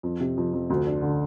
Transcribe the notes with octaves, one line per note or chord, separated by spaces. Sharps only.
F2
C3
F2
F2
D2
D4
D3